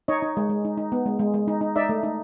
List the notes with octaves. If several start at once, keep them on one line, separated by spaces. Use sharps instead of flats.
D#4 C#5 D#5
D#4
G#3
G#3
D#4
D#4
B3
G#3
G#3
G#3
D#4
D#4
D#4 D5 E5
A3
D#4